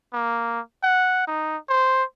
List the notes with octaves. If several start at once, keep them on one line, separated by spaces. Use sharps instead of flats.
A#3
F#5
D#4
C5